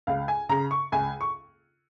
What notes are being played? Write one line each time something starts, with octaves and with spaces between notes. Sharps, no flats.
C#2 F5
G#5
C#3 A#5
C#6
C#2 G#5
C#6